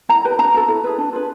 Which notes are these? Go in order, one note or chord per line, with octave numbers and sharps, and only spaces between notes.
E4 A#5
G4 B4
D4 A#5
F#4 A4
E4
G#4 B4
D4
F4 G#4 B4